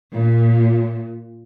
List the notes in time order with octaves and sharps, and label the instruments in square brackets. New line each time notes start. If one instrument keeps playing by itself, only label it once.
[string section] A#2